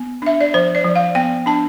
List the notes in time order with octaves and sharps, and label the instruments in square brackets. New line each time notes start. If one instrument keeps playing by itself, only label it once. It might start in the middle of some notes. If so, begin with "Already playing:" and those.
Already playing: [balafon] B3
D4 E5
D5
F3 C5
D5
F3
F5
B3 G5
D4 A5